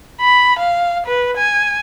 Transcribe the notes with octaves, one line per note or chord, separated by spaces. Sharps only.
B5
F5
B4
G#5